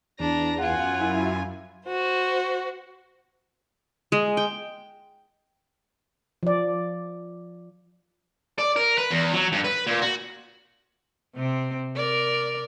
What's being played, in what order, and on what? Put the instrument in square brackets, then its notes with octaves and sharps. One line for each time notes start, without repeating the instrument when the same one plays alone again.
[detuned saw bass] E2 [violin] D4 A#5
[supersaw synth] F#2 [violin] F4 G#5 [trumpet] F#5
[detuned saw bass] E4
[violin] F#4 C5
[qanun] G#3
G5
[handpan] F3 D5
[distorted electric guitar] D5
A#4
B4
E2
F#3
G2
B4
A#2
F#4
[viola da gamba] C3 C4
A#4 D5